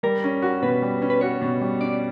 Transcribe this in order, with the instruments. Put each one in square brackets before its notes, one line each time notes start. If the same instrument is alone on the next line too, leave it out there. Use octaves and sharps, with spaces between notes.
[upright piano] G3 [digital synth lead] A#4
[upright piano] C#4
F#4
[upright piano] B2 [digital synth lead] B4
[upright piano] G3
C#4
[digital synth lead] B4
[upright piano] F#4 [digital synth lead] C#5
[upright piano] B2
G3
[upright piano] C#4 [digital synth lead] D5